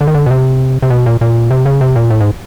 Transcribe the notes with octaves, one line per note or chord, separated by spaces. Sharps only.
D3
D#3
D3
B2
C3
C3
B2
A#2
A#2
C3
C#3
C3
A#2
A2
G#2